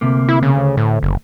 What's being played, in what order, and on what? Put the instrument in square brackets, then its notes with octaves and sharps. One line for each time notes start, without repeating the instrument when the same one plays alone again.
[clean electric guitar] D2 C3 A#3
[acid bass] E4
C#3
[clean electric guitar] D2
[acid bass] A2
F#1